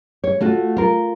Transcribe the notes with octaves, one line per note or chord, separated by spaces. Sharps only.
C#5
A3 F4 F#4
F4 A#4